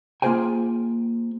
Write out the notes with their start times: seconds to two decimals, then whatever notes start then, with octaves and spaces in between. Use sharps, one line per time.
0.22 A#3 F4 G#4 C5 G5 G#5